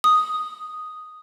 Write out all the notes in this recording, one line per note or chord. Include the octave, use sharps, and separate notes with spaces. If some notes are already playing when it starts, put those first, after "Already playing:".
D#6